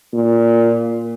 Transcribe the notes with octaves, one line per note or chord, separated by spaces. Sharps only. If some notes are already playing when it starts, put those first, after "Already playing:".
A#2